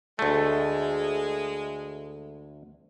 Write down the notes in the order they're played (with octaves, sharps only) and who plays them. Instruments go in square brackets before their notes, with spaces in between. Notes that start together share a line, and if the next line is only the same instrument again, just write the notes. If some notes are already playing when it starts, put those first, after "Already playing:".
[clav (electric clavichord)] D2 A3 [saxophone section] G#3